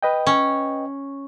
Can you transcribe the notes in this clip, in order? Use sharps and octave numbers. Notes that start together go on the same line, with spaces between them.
B4 D#5 G5
C#4